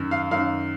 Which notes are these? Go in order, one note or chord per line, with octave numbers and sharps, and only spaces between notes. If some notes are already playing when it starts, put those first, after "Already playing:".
Already playing: F#2 D#3
F5
F#2 D#3 F5